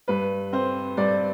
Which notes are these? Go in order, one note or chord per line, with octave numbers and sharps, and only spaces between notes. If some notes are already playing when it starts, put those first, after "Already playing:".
G2 B4
C4 C5
G2 D5